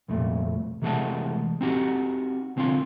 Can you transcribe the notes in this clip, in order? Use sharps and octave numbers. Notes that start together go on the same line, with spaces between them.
C2 F2 A#2 A3
C3 E3 G#3 A3 F#5 A5
C4 D#4 F#4 G4
C2 D3 C4 F4 F5 C6